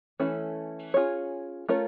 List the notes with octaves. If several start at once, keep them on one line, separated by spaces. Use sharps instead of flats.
E3 A3 C#4 E4 A4
C#4 F4 G#4 C#5
A3 C#4 F4 A#4 C#5